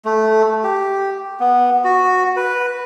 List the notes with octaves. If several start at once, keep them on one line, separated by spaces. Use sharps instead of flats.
A3
G4
B3
F#4
B4